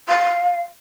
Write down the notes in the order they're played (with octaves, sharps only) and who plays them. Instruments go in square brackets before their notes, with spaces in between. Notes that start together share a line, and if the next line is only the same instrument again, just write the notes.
[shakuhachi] F5